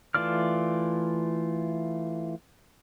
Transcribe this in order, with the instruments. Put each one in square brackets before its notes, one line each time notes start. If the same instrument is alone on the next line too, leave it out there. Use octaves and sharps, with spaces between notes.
[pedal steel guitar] E3 A3 F4 D5 F6